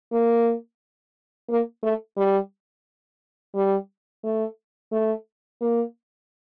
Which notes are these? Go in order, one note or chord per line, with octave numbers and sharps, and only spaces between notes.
A#3
A#3
A3
G3
G3
A3
A3
A#3